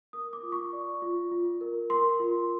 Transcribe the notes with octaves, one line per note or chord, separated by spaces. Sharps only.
A#4 D#6
D6
F4
C#6
D5
F4
F4
A#4
A#4 C6
F4